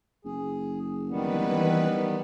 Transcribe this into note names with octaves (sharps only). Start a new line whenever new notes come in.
F#1 G#4
D#3 E3 G3 B3 B4